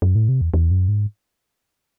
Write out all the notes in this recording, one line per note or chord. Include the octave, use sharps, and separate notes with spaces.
F#2
A2
C3
E2
E2
F#2
G#2